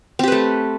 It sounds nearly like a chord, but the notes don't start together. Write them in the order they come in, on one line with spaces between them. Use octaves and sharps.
C4 G4 B4 A3